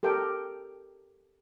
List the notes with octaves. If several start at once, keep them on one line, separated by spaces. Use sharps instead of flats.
G4 A4 A#4 G5